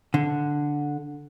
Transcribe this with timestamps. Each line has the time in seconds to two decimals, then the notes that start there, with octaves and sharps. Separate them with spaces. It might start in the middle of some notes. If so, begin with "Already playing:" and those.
0.14 D3